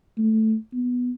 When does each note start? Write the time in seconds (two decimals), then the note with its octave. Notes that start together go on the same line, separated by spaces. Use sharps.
0.18 A3
0.73 B3